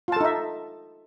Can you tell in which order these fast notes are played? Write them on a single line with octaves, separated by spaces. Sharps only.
F4 A5 A4 D#4 E5